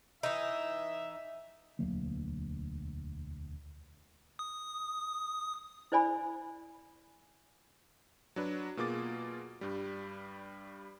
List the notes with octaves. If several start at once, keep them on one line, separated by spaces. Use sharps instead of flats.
E3 D#4 E5
E1 D2 F#3 A#3
D#6
E4 C5 D5 G#5 B5
F#3 D4 B4
B2 A#3 F4 G#4 D6 A6
G2 G3